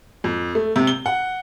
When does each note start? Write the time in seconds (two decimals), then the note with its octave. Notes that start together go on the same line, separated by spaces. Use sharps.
0.24 F2
0.55 A3
0.76 C3
0.87 G7
1.06 F#5